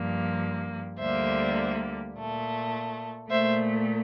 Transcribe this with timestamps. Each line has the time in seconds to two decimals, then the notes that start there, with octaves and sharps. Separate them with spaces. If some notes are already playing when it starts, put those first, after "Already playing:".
Already playing: G2 F3 A#3
0.99 D2 D3 G3 A#3 C5 E5
2.15 A#2 A3
3.30 A#2 A3 C5 E5